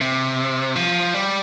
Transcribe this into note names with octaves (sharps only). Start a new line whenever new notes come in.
C3
F3
G3